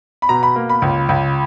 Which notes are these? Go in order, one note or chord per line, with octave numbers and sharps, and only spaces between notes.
B5
B2 A#5
B5
A#3
B5
C#2
C#2